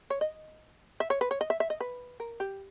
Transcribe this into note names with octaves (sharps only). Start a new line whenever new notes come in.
C#5
D#5
E5
C#5
B4
C#5
D#5
E5
E5
D#5
B4
A#4
G4